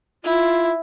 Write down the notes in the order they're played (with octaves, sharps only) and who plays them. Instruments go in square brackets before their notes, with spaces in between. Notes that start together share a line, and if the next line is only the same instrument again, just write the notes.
[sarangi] E4 [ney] F4